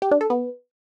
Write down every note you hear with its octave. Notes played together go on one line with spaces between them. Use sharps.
G4
D4
A4
B3